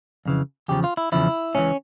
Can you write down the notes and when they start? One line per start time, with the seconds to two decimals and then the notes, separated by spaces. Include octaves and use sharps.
0.25 F2 C#3 E3
0.68 E2 C#3 F3 G4
0.84 F4
0.97 E4
1.12 E2 C#3 F3 E4
1.55 C#2 C#3 E3 C#4